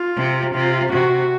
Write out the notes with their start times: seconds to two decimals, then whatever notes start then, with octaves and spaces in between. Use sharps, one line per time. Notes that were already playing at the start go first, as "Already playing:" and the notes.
Already playing: F4
0.16 C3
0.54 C3 F4
0.92 C3 F#4